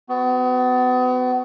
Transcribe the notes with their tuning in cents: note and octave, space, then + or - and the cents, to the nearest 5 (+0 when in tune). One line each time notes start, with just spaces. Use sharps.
B3 +35 F#4 +0